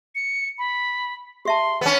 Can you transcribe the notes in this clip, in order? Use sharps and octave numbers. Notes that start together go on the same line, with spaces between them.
C#7
B5
G4 E5 A5 C6
B3 C#4